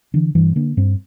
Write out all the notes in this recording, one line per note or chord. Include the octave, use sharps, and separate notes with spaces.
D3 E3
G2 E3
D3 A#3
G2 C4